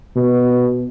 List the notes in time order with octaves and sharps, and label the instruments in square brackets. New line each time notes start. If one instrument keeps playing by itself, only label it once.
[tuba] B2